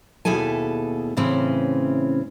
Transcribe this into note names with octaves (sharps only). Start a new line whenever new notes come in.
D#2 B2 E4 G#4 A4 G#5
A2 C#3 E3 C4 C#4